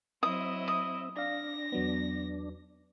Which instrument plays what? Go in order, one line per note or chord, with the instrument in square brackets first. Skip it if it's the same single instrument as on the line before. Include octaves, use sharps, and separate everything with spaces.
[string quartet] F#3 E4 D#5 [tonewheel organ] C4 E5 [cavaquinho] D#6
[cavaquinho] D#6
[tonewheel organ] D4 [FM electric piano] D5 F5 [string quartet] A#6
[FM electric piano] E2 F#3 B3